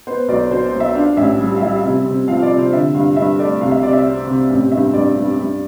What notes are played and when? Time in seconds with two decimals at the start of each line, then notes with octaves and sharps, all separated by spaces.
0.07 B3 C5
0.28 B1 D5
0.50 B2 C5
0.65 C5
0.72 B1
0.80 E5
0.95 D4 F5
1.17 A1 E5
1.39 G3
1.57 F5
1.61 G3 E5
1.75 F5
1.84 C3 E5
2.06 C3
2.28 F3 F5
2.42 D5
2.50 C3
2.58 C5
2.72 D3 E5
2.94 G2 F5
3.17 G2 E5
3.38 A3 D5
3.61 C2 F5
3.71 E5
3.83 C3 D5
3.93 E5
4.06 C4
4.27 C3
4.50 A1
4.72 G2 E5
4.93 G2 D5
5.16 G2
5.39 G2